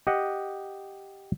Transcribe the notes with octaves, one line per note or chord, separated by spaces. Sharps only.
G4 D#5 F#5